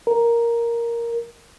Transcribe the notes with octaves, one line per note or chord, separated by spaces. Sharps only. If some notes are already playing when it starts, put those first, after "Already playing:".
A#4